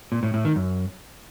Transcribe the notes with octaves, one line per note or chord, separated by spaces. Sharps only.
A#2
A2
A2
D#3
F#2